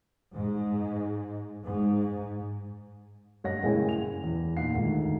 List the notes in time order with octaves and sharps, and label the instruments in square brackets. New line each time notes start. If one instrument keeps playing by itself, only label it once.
[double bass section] G#2
G#2
[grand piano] G2 C#5 D#5 F#5 A#6
F#1 A2 G#3 E4 G5 G#5
F7
E2
A#2 D#4 F4 F#5 C7
D2 G#2 D#3